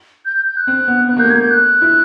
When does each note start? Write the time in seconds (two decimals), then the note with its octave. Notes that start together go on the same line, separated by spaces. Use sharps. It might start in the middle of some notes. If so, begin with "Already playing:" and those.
0.25 G6
0.36 G6
0.46 G6
0.57 F#6
0.67 C4
0.88 B3
1.09 B3 F#6
1.17 A#3 G6
1.25 A3
1.30 A#3 G#6
1.40 G6
1.50 F#6
1.82 E4